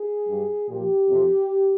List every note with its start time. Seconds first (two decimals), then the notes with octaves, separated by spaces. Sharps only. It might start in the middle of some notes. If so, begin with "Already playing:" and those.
Already playing: G#4
0.27 G2 G3
0.68 A#2 F3 G4
1.09 F2 C3 F3